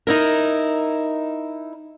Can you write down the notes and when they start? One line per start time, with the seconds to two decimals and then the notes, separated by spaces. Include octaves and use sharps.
0.07 D#4 E4 A#4